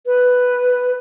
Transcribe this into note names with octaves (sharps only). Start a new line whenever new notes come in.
B4